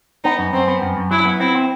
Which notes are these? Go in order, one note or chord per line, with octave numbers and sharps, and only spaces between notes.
B3 D#4
F#2
F#2 C4
B3
F#2
F#2
F#3 E4
B3
C4 E4
C4